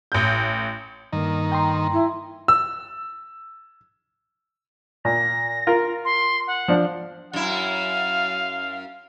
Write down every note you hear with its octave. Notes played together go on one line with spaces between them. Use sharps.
A1 G6
G2 D#3 A#3
G5 A#5 C6
E4
E6
A#2 A#6
F4 A#4
C6
F#5
F3 D4
F#2 E4 F5